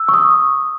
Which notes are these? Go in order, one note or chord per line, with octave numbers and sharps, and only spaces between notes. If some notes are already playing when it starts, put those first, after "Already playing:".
Already playing: E6
C#6
D#6